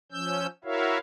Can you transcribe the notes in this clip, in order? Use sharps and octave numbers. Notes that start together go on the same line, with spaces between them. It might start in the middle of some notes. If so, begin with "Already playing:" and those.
F3 C#4 E6 G6
E4 F#4 A#4 C#5 E5 F5